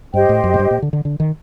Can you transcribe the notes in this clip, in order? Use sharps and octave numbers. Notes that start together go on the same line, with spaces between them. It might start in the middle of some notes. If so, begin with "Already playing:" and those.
G2 G4 C5 D#5 G5
A2
F#2
A2
G2
A#2
D3
D3
D3
D#3